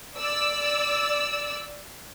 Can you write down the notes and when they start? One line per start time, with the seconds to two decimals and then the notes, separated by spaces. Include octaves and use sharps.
0.17 D5 E6